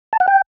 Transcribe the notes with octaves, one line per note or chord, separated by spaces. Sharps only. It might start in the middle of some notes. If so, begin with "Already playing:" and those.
A5
F#5
G5